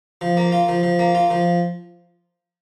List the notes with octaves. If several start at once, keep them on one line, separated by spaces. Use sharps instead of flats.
F3
A#3
F4
F3
F3
A#3
F4
F3